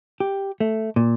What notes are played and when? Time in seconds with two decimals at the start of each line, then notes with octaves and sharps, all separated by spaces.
0.20 G4
0.60 A3
0.96 A#2